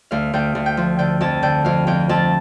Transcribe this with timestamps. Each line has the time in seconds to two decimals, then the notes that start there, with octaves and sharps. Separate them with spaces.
0.11 D2 F5
0.33 D2 G5
0.55 D2
0.66 G5
0.77 F3
0.99 D3 G5
1.21 F2 A5
1.43 D3 G5
1.65 F2 F5
1.87 F2 G5
2.09 F2 A5